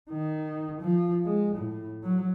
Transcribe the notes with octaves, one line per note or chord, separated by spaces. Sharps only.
D#3
F3
G#3
A2
F#3